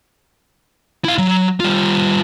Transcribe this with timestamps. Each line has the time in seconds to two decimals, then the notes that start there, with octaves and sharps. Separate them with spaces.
1.05 E4 F5
1.18 F#3
1.60 G3 F4